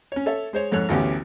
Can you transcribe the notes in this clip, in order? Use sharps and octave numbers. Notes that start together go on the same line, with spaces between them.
C#4 C#5
A4 C#5 E5
G#3 C5 C#5
F2 G#2 A4 C#5 F#6
A1 D2 B3 C#4 G4